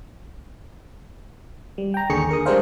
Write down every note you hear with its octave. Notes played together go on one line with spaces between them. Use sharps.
G3
G5 A#5
D#2 D3 G#4 C#6 C#7
A#4 D#6
G3 G#3 D4 A#4 C5 F5